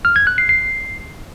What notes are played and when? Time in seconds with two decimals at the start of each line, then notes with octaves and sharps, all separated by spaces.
0.05 F6
0.16 G#6
0.27 F#6
0.38 C7
0.49 C7